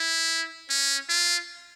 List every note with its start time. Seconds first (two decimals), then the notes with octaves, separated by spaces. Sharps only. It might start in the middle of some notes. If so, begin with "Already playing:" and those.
Already playing: E4
0.69 C#4
1.09 F4